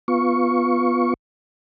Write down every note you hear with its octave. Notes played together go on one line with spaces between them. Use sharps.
B3 F4 C#6